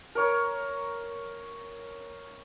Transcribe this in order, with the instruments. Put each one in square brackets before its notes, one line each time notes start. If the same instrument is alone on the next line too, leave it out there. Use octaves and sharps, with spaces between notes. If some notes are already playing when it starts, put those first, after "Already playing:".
[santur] A#4 C#5